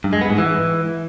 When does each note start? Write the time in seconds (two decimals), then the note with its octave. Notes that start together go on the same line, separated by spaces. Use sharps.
0.04 G2
0.13 G#3
0.21 B3
0.30 G#2
0.38 E3